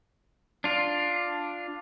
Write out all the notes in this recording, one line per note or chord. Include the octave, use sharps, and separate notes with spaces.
D4 F4